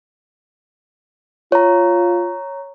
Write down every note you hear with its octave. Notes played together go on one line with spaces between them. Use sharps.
F4 C#5 A#5